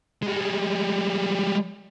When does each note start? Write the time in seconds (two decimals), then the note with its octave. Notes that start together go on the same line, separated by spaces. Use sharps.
0.23 G3 G#3